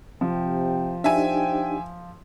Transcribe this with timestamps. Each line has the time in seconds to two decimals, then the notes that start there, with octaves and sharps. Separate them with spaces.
0.21 C3 F3 G5
1.04 D4 D#4 G4 C5 E5 G5 G#5